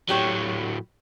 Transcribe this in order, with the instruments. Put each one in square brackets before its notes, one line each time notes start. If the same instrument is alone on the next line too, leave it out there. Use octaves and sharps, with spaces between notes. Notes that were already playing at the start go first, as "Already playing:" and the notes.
[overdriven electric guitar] A2 F#3 [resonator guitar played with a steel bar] B3 G4 C#5